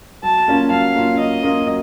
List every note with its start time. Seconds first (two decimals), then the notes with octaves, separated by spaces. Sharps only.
0.23 F#3 A5
0.48 A#3 C#4 F4
0.71 F#3 F5
0.95 A#3 C#4 F4
1.19 F#3 D#5
1.43 A#3 C#4 F4
1.67 F#3